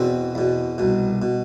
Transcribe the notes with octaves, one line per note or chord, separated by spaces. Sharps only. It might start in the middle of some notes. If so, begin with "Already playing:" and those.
Already playing: E2 B2 C4
E2 B2
C2 B2
B2